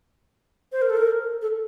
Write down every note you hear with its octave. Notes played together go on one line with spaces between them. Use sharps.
C5
A#4
A4
A#4
A4